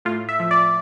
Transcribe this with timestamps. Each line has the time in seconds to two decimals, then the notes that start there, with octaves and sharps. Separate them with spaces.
0.05 A2 F4
0.29 E5
0.39 F3
0.51 D5